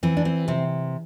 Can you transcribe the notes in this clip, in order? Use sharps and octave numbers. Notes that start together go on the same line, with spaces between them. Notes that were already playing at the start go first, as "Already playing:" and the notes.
E3 C4
D4
C4
C3 C4